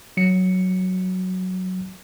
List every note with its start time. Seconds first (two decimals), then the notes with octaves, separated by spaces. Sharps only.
0.17 F#3 C#7